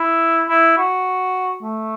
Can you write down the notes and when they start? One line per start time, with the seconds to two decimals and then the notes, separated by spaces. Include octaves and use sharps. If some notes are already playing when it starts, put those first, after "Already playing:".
Already playing: E4
0.49 E4
0.78 F#4
1.62 A3